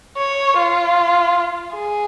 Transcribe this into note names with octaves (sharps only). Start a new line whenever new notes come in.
C#5
F4
G#4